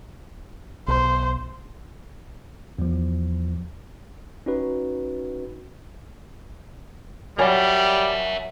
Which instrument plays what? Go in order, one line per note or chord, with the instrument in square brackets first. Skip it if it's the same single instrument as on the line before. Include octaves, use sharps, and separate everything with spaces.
[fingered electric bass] B1 [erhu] C5
[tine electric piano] E2 F3
C#4 D#4 F#4 B4
[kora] F#3 F5 [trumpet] G3 [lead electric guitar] A#4 E5 [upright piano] C#5 G#5